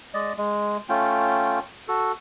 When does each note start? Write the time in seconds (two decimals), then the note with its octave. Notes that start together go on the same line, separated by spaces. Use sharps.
0.14 G#3 D5 D#5
0.38 G#3
0.89 A3 C#4 F4 G5
1.88 F#4 A4